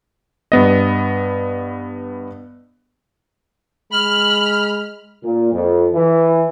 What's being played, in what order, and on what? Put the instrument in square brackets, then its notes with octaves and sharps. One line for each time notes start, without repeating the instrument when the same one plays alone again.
[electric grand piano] G2 B3 D#5
[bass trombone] G#3 [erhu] B5 [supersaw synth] F6 [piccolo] F#7
[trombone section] A#2
F2
E3